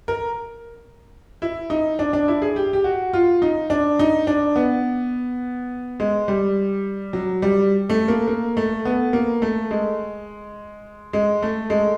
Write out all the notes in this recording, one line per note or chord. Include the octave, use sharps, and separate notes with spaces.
A#4
E4
D#4
D4
D4
E4
G#4
G4
G4
F#4
F4
D#4
D4
D#4
D4
B3
G#3
G3
F#3
G3
A3
A#3
A#3
A3
B3
A#3
A3
G#3
G#3
A3
G#3